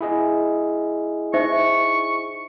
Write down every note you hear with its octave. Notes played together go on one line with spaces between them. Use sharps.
E4 G#4 D#5
D#4 C5 E5 C#6